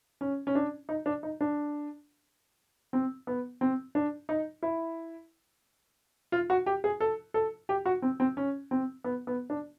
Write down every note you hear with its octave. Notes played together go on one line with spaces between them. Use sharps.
C#4
C#4
D4
D#4
D4
D#4
D4
C4
B3
C4
D4
D#4
E4
F4
F#4
G4
G#4
A4
A4
G4
F#4
C4
C4
C#4
C4
B3
B3
D4